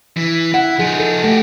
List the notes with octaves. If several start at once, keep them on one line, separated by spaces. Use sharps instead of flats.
E3
E4 F#5
F3 D#4 G#4
A4
A3 F#4 G4